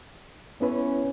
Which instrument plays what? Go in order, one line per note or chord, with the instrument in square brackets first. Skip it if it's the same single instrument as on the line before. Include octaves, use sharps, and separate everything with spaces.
[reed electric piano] B3 E4 B4 [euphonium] C#4